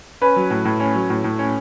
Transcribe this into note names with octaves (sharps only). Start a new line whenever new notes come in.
C#4 B4
F#3
A2
A2
C#4
F#3
A2
A2
C#4